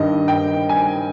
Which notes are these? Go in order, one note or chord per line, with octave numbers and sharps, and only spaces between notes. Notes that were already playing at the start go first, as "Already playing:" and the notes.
Already playing: G2 D#3 D#5
G5
G#5